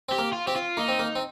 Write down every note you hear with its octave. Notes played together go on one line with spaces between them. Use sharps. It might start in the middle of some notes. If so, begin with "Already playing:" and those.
C4 G4
A#3
F4
C4 G4
F4
A#3 D#4
C4
A#3
C4